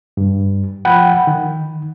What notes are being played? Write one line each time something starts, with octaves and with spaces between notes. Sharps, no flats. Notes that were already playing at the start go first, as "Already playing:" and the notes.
G2
F3 F#5 G5 B5
D#3